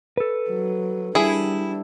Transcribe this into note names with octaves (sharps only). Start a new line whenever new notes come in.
A4 B4
F#3
G3 D4 E4 G#4